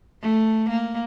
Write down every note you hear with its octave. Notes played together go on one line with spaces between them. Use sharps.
A3
A#3